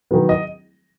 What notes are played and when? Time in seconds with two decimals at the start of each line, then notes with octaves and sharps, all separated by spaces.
0.11 D#3 F#3 B3
0.29 D#5